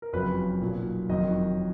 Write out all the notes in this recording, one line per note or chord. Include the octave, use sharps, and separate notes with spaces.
A#4
F#1 F2 C#3 F#3 B4
B1 A#2 F#3
F#1 F2 D#3 F#3 D#5